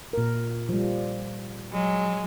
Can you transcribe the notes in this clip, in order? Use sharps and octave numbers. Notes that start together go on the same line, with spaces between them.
A#2 A#4
F3 G3
F#3 G#3